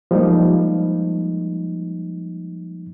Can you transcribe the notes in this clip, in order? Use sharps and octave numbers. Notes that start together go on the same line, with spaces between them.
F3 G3 G#3 A#3 D#4